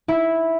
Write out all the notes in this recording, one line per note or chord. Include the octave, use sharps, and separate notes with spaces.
E4